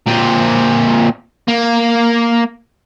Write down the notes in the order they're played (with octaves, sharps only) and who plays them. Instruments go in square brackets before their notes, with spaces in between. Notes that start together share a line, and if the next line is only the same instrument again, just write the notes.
[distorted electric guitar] A#2 C4
A#3